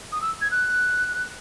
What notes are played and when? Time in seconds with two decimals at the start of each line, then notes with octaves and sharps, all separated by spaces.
0.12 D#6
0.21 E6
0.41 G#6
0.51 F#6